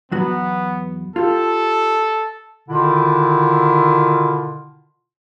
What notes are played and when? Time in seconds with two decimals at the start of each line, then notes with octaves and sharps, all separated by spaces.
0.12 E2 F#3 B3 F#4
1.16 F4 G4 A4
2.69 B2 D3 D#3 E4 F4